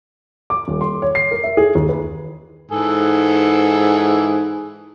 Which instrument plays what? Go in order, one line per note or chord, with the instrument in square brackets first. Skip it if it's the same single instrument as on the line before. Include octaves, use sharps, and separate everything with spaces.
[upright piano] D6
D#1
C6
C#5
C7
A#4
E5
G#4
D#2
B4
[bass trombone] G#2 [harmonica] E3 G#4 A4